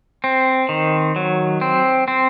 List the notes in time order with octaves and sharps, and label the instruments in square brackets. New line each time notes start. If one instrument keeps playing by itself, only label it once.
[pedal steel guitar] C4
D#3
F#3
C4
C4